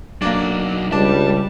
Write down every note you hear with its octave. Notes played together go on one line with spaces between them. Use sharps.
B1 F#3 A#3 D4
C#2 G3 D4 A5